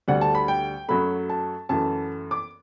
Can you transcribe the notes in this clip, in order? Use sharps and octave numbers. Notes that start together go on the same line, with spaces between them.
D2 D3 G3 F#5
A5
B5
G5
F#2 F#3 A3 B5
A5
F#2 E3 A3 A5
D6